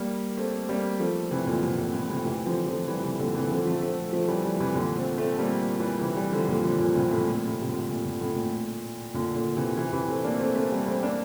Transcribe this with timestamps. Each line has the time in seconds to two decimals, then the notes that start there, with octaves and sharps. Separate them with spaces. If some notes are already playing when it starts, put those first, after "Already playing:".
Already playing: G3 A#3
0.37 A3 C4
0.69 G3 A#3
0.99 F3 A3
1.31 C3 E3
1.47 A#2 D3
1.63 A2 C3
1.78 A#2
1.93 A2
2.09 A2 C3
2.25 C3 E3
2.46 D3 F3
2.67 D3 F3
2.88 E3 G3
3.03 C3 E3
3.19 A#2 D3
3.35 C3 E3
3.50 D3 F3
3.66 F3 A3
3.82 A3 C4
4.13 F3 A3
4.28 E3 G3
4.45 E3 G3
4.60 C3 E3
4.76 A#2 D3
4.96 A3 C4
5.17 A3 C4
5.39 G3 A#3
5.80 E3 G3
6.01 C3 E3
6.16 E3 G3
6.32 D3 F3
6.48 A#2 D3
6.64 D3 F3
6.79 A#2 D3
6.96 A2 C3
7.11 A2
7.27 A#2
7.47 A2 C3
7.61 C3
7.69 A#2 D3
7.89 A#2
8.05 A#2
8.21 A2
8.36 A#2
9.14 A#2 D3
9.35 A#2 D3
9.57 C3 E3
9.77 C3 E3
9.93 C3 E3
10.08 A3 C4
10.24 A#3 D4
10.39 A3 C4
10.55 A3 C4
10.72 G3 A#3
10.87 A3 C4
11.02 A#3 D4